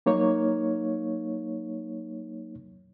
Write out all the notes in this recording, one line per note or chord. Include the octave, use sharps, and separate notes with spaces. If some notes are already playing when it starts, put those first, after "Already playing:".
F#3 A#3 D#4 C#5